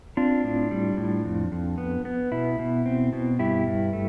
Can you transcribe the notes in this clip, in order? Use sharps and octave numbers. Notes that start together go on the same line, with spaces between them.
C4 D4 F4
A2
G3
A2
F2
F2
B3
B3
B2 E4
B2
C4
B2
G2 E4 G4
G2
A3